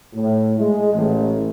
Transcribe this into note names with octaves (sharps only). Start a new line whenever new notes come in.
A2
G#3
A1